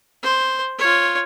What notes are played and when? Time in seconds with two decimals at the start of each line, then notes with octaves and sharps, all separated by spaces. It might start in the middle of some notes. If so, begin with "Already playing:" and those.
0.23 C5
0.78 F4 C#5